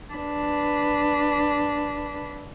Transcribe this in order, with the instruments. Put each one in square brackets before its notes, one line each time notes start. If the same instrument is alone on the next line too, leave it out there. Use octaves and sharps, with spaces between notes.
[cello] D4 B4